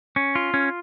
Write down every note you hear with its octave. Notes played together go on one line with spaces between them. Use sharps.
C#4
F4
C#4